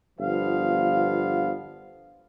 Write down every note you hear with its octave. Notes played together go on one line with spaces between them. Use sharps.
G1 F3 B3 F5